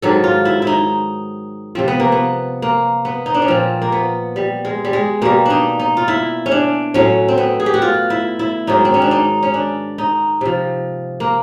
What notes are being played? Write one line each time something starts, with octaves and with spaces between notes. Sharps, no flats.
G#2 D#3 F#3 A4
F4
E4
E4
D#4
C3 F3 C4
B3
A#3
B3
A#3
B3
D#4
D4
C#4
A#2 F3 C4
A#3
B3
G3
G#3
G3
G#3
B2 G3 A#3
D4 D#4
D#4
F4
E4
C#4
D4
A2 F#3 C#4
C4
B3
G#4
G4
F#4
F4
E4
E4
G#2 D#3 F#3 D#4
C4
C#4
D4
D#4
C#4
D4
D#4
C3 F3
A#3